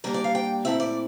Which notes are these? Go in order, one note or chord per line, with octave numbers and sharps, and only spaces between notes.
A#2 G3 A#3 D4 A#4
D5
F5
G5
A#2 A3 C4 E4 E5
D5